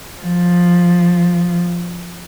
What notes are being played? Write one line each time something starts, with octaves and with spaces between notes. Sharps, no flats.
F3